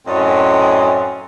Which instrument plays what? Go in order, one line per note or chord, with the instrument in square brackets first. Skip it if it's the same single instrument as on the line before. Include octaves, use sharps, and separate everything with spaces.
[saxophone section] F#2 A2 C4 C#4 D5 D#5